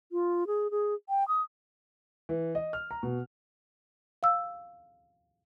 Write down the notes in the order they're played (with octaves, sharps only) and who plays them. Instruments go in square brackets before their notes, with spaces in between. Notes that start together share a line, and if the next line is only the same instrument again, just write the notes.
[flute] F4
G#4
G#4
G5
D#6
[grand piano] E3
D#5
F6
A#5
B2
[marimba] F5 E6